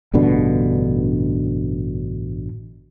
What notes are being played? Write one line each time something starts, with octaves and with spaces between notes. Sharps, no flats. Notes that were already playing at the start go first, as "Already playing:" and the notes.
A1 G2 B2 D3